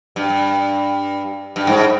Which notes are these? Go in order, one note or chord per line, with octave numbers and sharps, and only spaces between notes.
G2
G2
G#2